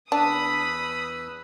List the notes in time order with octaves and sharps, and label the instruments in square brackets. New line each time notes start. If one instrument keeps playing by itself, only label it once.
[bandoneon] E2 B4 E6 [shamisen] D4 [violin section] B5 D#6